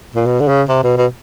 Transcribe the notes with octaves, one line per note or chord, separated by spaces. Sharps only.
A#2
B2
D3
C#3
C3
B2
B2